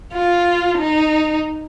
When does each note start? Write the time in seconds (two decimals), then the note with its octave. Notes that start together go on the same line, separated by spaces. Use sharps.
0.14 F4
0.78 D#4